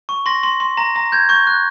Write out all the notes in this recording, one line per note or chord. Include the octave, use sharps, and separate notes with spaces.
C#6
C6 A#6
C6
C6
A#5 A#6
A#5 A#6
G6 G#6
C#6 G6
F#6